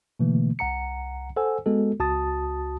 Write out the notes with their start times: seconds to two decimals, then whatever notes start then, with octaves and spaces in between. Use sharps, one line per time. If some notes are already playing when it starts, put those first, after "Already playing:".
0.19 B2 D3 E3 A3 A#3
0.59 C2 F#5 A#5 C#7
1.36 A4 C5 F#5 G#5 E6
1.66 G#3 B3 F#4 A4
2.00 C#2 F#4 A5 D#6 A6